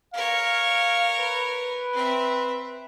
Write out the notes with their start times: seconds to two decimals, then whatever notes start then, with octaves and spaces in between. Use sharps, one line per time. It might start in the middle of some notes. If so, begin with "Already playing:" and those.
0.14 A#4 C#5 F5
1.19 B4
1.93 C4 E5